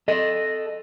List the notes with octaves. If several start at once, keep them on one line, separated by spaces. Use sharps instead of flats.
A4 D#5